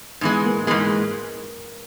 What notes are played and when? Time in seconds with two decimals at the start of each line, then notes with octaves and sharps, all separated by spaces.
0.21 G#2 E3 G#3 B3
0.45 A#3
0.66 G#2 E3 G#3 A#3